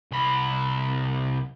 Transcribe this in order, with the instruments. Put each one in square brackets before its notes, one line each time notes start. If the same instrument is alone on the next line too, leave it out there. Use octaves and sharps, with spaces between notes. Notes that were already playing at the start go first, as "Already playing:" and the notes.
[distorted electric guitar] C2 B5